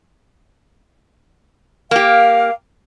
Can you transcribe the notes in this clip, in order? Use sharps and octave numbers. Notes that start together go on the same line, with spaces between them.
A#3 G4 F5